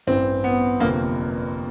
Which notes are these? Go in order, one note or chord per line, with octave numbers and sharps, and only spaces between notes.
A1 G2 E3 C4
B3
G1 F2 C3 F3 A#3